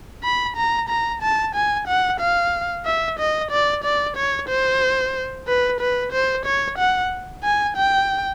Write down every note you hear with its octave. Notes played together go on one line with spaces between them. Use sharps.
B5
A#5
A#5
A5
G#5
F#5
F5
E5
D#5
D5
D5
C#5
C5
B4
B4
C5
C#5
F#5
G#5
G5